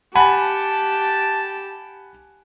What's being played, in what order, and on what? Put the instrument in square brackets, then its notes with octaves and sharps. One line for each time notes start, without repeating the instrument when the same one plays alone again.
[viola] G4 [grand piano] F#5 G#5 B5 [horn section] A5